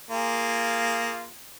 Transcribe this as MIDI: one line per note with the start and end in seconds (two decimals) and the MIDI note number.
0.11 1.28 58
0.11 1.28 65
0.11 1.28 68